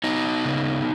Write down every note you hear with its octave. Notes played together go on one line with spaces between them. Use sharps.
B3 D#4
C#3